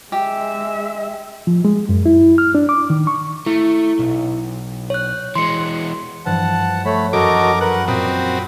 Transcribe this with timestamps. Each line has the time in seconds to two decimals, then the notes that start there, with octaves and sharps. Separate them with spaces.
0.12 G#3 G4 E5
1.47 F3
1.65 G#3
1.89 F#2
2.06 E4
2.38 F6
2.55 D4
2.69 D6
2.90 D#3
3.07 C#6
3.46 A3 E4
3.99 B1
4.90 C#5 F#6
5.36 E3 G#3 C6 C#7
6.26 G2 E3 F3 F#5 A5
6.85 A3 C#5 B5
7.13 F#2 F#4 A4 A#4 D#5 D6
7.61 A#4 B4 F#5
7.88 A#2 C4 F#4 G5 B5 D#6